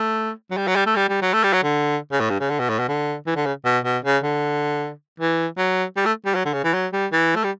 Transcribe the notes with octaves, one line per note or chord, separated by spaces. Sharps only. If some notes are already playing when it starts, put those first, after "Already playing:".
Already playing: A3
F#3
G3
F#3
G3
A3
G3
G3
F#3
A3
G3
F#3
D3
C#3
A2
G2
C#3
D3
B2
A2
B2
D3
E3
D3
C#3
B2
B2
C#3
D3
E3
F#3
G3
A3
G3
F#3
D3
C#3
E3
F#3
G3
E3
A3
G3